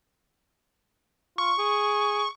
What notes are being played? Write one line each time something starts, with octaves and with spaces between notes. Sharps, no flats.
F4 C#6
G#4